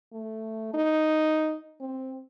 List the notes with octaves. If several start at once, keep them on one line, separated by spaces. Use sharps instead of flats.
A3
D#4
C4